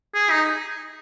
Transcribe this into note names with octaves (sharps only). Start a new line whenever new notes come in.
G#4
D#4